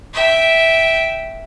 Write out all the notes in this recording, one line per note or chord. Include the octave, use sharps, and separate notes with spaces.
E5 G5